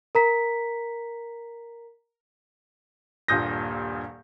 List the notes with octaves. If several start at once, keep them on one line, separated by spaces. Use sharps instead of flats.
A#4 A#5 B6
D#1 G2 A#2 D#6 G6 A#6